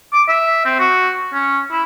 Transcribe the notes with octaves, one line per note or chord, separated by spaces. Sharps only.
D6
E5
C4
F#4
C#4
E4